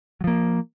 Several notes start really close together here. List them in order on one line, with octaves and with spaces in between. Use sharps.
F#3 F3 A#3